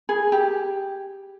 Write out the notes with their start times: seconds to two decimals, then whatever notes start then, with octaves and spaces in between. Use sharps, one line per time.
0.09 G#4
0.32 G4